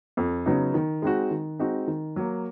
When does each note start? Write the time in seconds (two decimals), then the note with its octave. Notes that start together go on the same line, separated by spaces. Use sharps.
0.17 F2
0.46 C#3 F#3 B3 D#4
0.74 D#3
1.02 G#3 C4 D#4 F#4
1.31 D#3
1.59 G#3 C4 D#4 F#4
1.88 D#3
2.16 F#3 A#3